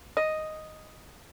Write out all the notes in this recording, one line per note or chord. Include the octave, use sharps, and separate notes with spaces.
D#5